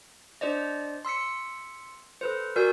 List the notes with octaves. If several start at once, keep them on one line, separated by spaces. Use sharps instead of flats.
D4 C5 D5 D#5
C6 E6 B6 C#7
A4 B4 C5
F#4 A#4 D5 G#5 E6 G6